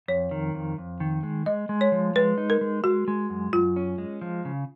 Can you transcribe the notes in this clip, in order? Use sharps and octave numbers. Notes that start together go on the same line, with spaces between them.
F2 C#5
D#3
F2
F2
D#3
G#3
G#3 D#5
G#3
C#5
F3
G#3 B4
D#4
A#4
G#3
G#3 F#4
G#3
F#2
F#2 F4
C#4
G#3
F3
C#3